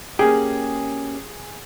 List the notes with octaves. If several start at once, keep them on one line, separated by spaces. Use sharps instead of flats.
A#3 C#4 G4 G#4